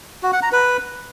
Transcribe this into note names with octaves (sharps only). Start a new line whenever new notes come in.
F#4
F#5
A#5
B4